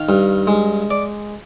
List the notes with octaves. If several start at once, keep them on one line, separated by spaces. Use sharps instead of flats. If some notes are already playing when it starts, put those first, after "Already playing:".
Already playing: D#3 F5
G2
G#3
D5